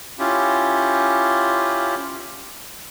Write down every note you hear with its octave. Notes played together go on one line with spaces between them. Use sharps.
C#4 E4 F4 G4